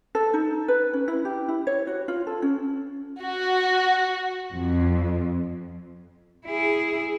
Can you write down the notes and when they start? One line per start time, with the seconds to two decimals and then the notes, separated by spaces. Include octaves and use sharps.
0.15 A4
0.34 D#4
0.68 B4
0.93 C#4
1.08 E4
1.25 G4
1.48 E4
1.67 C#5
1.87 F#4
2.08 F4
2.27 A4
2.42 C#4
3.22 F#4
4.53 F2
6.46 E4 G#4